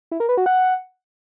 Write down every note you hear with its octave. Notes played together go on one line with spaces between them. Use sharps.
E4
A#4
B4
F#4
F#5